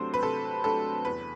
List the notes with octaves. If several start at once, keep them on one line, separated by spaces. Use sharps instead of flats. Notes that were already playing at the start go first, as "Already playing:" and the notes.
Already playing: C3 F#3 A3 D4 C5
B4
C3 A4
F#3 A3 D4 A4
E2 B4